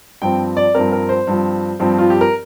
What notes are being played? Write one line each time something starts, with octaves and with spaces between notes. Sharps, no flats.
G2 F3 C4 G5
D5
G2 F3 C4 A#4
A#4
C5
G2 F3 C4
G2 F3 C4
F4
G4
A#4